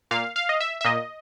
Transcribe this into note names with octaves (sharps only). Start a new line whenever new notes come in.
A#2 F5
F5
D#5
E5
E5
A#2 D#5